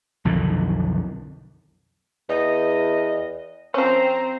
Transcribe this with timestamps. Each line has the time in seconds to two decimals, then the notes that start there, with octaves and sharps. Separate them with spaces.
0.25 B1 F2 D3 D#3
2.29 E2 D#5
3.74 F3 C4 C#4 C5 A#5